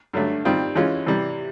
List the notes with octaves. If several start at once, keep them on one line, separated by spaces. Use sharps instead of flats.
G2 D3 F#3 A3
D#3 G3 C4 F4
E3 G#3 C#4 F4
C3 E3 G3